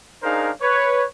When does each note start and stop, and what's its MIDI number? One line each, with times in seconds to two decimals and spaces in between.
0.23 0.50 62
0.23 0.50 63
0.23 0.50 68
0.23 0.50 70
0.23 0.50 72
0.23 0.50 77
0.62 1.04 71
0.62 1.04 73